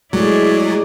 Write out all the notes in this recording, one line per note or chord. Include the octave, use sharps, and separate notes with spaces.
F#3 G#3 A3 E4 G#4 D5